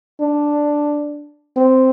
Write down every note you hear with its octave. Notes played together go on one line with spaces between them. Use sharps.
D4
C4